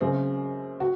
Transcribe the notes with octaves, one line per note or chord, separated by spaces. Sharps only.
F#1 F#2 C#3 C4
F#4